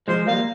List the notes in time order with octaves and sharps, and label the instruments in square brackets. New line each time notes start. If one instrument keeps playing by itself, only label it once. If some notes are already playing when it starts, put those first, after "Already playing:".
[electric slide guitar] F3 G#3 [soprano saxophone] C5
[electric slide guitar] G3 A#3 [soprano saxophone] F5